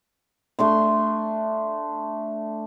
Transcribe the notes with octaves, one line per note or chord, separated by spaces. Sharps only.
A3 D4 C6